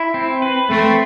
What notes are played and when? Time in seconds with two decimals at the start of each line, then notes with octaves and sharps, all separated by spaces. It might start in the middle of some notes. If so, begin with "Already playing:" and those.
Already playing: E4
0.14 C4
0.42 B4
0.70 A3 C4